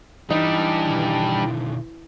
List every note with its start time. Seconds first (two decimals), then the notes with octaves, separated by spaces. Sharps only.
0.30 E3 G3 D4 D#4
0.86 B2 D3 D#3